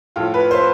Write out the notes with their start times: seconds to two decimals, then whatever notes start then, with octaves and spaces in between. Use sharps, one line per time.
0.16 A2 F3 F4
0.34 B4
0.51 C5